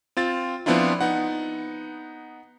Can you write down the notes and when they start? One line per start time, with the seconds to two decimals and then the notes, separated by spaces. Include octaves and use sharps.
0.17 C4 F4 A6
0.66 F3 B3 C4 D4 E4 F4
1.01 B3 D#4 F#5